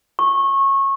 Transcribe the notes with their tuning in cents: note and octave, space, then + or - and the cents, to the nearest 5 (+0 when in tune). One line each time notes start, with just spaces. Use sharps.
C#6 -20